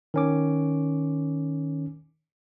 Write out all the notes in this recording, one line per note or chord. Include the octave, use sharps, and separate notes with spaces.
D#3 C#4 D6